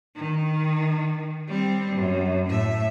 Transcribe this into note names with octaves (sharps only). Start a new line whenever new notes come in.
D#3
G3 C4
F#2
A2 E5